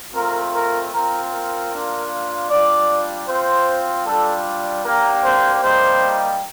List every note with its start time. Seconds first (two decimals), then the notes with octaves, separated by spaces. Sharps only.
0.14 A3 C4 F4 A#4
0.53 A#4
0.92 C4 F4 A#4
1.32 A#4
1.71 A#3 D4 F4
2.49 G3 D4 F4 D5
3.28 C4 F4 C5
4.06 G3 D4 F4 A4
4.84 A#3 D4 G4 A#4
5.24 C5
5.62 G3 A#3 D#4 G4 C5